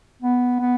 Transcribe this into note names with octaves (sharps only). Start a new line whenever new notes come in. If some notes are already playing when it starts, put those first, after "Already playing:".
B3
B3